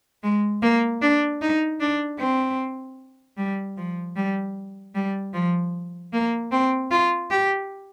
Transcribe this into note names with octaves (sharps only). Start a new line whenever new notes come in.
G#3
A#3
D4
D#4
D4
C4
G3
F3
G3
G3
F3
A#3
C4
F4
G4